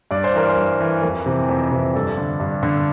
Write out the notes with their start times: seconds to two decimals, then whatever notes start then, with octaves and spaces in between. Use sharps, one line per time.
0.11 G2 D5
0.24 C5
0.34 E3 A#4
0.48 C5
0.56 G2
0.80 E3
1.02 F2 A#4
1.26 C3 E3
1.49 F2
1.71 C3 E3
1.94 G2 A4
2.17 D3
2.40 G2
2.63 D3